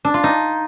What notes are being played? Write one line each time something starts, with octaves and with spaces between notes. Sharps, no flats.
D4
F4
D#4